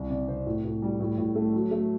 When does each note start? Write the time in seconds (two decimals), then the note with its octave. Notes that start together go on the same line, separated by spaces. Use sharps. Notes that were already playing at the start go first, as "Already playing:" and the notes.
Already playing: C2 C3
0.10 C3 D5
0.28 C3 C5
0.46 A2
0.64 A2
0.82 G3
1.00 A2
1.18 A2
1.35 A3
1.54 F#3
1.71 A3